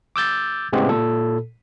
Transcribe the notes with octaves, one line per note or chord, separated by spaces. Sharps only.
D6 E6 G6 A6
A2 C#3 G#3 B3 C4 G4
A#2 A4